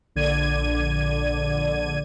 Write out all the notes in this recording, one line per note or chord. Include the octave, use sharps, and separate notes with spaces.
A#1 D3 D5 G#6 D#7